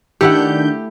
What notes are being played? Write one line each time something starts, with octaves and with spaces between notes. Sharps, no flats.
D#3 A3 D4 E4 G4 F#5 G6